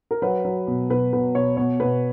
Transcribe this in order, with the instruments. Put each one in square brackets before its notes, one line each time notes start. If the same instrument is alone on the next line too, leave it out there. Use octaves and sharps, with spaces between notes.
[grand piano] A#4
F#3 B4
F#3
B2
B2 B4
B2 B4
B2 C#5
B2 C#5
B2 B4